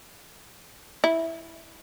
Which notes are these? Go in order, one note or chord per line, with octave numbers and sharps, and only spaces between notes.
E4